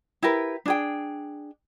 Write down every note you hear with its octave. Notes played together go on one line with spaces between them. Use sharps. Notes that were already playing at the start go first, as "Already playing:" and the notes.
E4 G4 A#4 B4
D4 G#4 G5